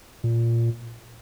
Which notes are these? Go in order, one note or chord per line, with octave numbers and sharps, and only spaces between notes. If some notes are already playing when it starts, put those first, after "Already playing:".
A#2